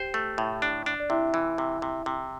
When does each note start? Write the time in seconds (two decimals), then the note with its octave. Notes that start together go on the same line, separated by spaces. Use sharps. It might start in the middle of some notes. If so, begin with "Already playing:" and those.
Already playing: G4 C5 G5
0.14 A3
0.38 A2
0.62 D4
0.86 D4
1.00 D5
1.10 C3 E4 E5
1.34 E3
1.58 C3
1.82 C3
2.06 C3